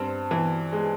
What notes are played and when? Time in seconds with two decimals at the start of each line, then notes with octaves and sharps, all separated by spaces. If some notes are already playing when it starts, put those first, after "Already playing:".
Already playing: G2 C4
0.31 E3
0.72 G#3